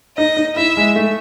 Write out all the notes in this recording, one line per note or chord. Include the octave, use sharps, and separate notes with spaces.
D#4 D#5
D#4
E4 E5
G#3
A3